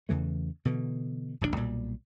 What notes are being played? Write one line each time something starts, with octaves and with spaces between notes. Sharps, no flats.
E2 C#3 E3 A3
B2 D3 E3
D1 A#1 C3 D4
B1 A#2 G3